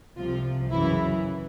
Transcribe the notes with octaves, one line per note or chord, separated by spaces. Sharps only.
C2 C3 F3 F4
F#2 C#3 E3 E4